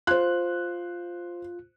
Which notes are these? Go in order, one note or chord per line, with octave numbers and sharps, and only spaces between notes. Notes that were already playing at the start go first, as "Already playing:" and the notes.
F4 C5 F#6